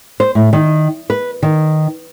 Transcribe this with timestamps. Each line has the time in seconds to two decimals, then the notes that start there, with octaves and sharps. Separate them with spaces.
0.20 C5
0.35 A2
0.53 D#3
1.10 B4
1.43 D#3